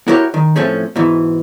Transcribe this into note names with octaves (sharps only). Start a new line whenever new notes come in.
E4 F#4 G4 A#4 C#5
D#3
A2 F3 A3 C4 C#4
G#2 B2 E3